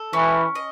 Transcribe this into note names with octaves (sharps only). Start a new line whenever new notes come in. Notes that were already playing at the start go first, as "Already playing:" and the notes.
Already playing: A4
E3 C#4
D#5